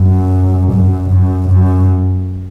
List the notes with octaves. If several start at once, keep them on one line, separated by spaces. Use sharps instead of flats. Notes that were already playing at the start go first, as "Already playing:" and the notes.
Already playing: F#2
F#2
F#2
F#2